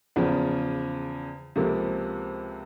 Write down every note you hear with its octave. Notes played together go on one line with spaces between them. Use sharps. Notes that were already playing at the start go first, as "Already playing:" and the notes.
E2 C#3 F3
C#2 C3 F3 A#3